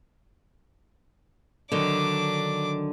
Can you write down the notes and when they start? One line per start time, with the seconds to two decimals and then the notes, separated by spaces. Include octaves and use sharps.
1.72 D3 D#3 F#3 D4 D6